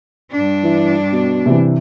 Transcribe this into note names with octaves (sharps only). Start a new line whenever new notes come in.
G2 D4
E3
B2
C3 E3